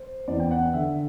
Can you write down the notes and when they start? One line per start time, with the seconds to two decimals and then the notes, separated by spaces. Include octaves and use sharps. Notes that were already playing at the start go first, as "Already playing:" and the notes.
Already playing: C5
0.28 E2 D5
0.40 G5
0.51 F#5
0.74 D3 E5